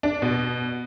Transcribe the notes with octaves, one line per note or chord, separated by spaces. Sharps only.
D4
B2